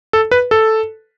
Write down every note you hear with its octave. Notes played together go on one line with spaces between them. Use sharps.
A4
B4
A4